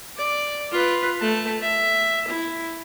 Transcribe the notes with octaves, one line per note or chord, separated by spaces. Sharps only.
D5
F4 B4
A3 A5
E5
E4